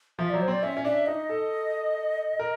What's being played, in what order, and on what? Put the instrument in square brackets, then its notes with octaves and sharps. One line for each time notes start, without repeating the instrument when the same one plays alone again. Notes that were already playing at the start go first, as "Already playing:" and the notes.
[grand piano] F3 [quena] E5
[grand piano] F#3 [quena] D5
[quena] C5
[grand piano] C4 [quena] D5
[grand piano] C#4 [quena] E5
[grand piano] C#4
[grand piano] D4 [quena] E5
[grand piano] D#4 [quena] D#5
[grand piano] A4
A#4